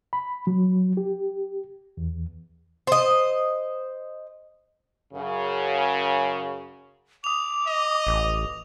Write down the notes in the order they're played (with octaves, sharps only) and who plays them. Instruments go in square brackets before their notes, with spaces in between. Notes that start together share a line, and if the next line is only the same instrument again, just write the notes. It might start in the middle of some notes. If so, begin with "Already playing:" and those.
[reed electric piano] B5
F#3
G4
E2
[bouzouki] C5 D#5
[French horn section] F#2 C#3
[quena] D6 [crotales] D#6 F7
[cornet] D#5
[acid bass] A1